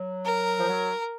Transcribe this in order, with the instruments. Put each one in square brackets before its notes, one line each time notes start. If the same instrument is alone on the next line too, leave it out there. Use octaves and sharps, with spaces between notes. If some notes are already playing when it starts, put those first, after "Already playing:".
Already playing: [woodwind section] F#3
[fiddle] A#4
[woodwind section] F3
F#3